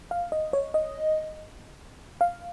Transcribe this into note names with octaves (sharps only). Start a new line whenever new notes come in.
F5
D#5
C#5
D#5
F5